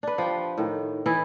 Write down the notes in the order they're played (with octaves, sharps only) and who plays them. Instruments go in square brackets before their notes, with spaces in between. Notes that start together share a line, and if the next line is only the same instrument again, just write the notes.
[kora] D4 B4
F3 G4 G5
A2 D#3
E3 E4 D#5